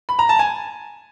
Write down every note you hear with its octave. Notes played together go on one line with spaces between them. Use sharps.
B5
A#5
A5
G#5